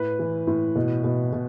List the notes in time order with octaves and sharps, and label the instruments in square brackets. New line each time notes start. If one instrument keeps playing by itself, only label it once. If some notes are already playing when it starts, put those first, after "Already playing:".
Already playing: [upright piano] A2 B4
E3
A2
B2
B2
B2